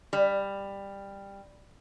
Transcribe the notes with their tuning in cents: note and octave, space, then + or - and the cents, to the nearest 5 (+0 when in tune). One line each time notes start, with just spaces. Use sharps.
G3 +15